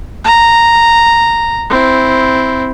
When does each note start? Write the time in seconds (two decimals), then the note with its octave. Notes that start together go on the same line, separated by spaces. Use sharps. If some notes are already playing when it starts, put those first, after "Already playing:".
0.25 A#5
1.70 C4 E4